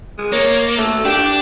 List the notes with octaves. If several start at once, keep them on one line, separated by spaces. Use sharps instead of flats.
G#3
A#3 C#5
A3
D4 G4